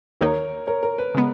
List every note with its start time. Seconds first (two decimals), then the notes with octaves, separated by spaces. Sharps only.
0.21 D#2 D#3 A#3 D#4 A#4 C#5
0.67 A#4 C#5
0.83 A#4
0.98 B4
1.14 C#3 G#3 B3